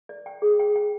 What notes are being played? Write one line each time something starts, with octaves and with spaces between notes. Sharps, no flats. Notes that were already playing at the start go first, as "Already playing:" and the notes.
D5
G5
G#4
G5
G5